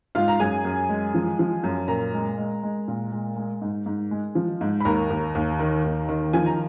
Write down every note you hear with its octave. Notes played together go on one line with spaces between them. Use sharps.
G#2 F4 F5
A#5
F#2 G#4 G#5
F#2
G#3
F3
F3
F#2
A#2 A#4 A#5
G#3
G#3
G#3
A#2
G#3
G#3
G#2
G#2
G#3
F3
G#2
B5
D#2 A#4 A#5
D#2
D#2
D#3
D#2
D#3
F3 G#5
A#5